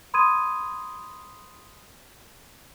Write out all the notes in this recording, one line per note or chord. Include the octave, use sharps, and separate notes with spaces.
B5 C6 D#6 G#6 D#7